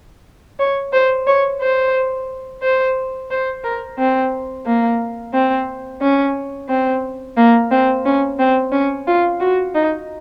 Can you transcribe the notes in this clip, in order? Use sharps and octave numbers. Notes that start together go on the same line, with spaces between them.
C#5
C5
C#5
C5
C5
C5
A#4
C4
A#3
C4
C#4
C4
A#3
C4
C#4
C4
C#4
F4
F#4
D#4